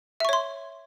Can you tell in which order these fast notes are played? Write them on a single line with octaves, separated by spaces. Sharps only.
E5 C#6 C#5 C6